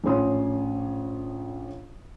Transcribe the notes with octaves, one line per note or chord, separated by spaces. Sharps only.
A#1 A2 C#4 C#5 C6 D#6